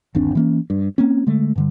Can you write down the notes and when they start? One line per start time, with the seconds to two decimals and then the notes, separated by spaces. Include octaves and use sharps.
0.15 G1 D#2 C4 D4
0.35 E3 A#3 C#4
0.70 G2
0.98 A#3 C4 C#4
1.27 D3 G#3 A3
1.56 G2 D3 G3